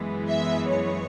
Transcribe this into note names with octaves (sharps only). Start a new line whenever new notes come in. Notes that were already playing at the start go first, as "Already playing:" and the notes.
Already playing: F#2 E3 G#3 B3
E5
C#5